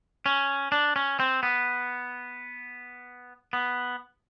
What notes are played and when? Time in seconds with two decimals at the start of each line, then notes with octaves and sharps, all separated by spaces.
0.26 C#4
0.72 D4
0.96 C#4
1.20 C4
1.43 B3
3.53 B3